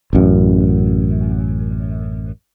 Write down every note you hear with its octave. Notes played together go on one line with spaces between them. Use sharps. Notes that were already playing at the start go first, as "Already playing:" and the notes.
A1 F#2